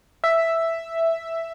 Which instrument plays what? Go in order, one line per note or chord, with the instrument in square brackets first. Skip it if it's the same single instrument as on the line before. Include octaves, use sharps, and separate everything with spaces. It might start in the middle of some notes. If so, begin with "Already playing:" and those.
[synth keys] E5